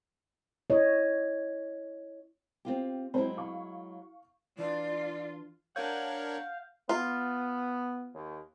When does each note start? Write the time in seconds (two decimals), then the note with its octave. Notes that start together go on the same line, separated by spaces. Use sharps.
0.70 E4 C#5 D#5
2.65 C4 F4 G4
3.14 F#3 G#3 C4 E4 C5
3.37 F5 C#6
4.59 E3 D4 F4 D5
5.76 D4 A#4 C#5 F5 F#5 G6
6.89 B3 F4
8.15 D#2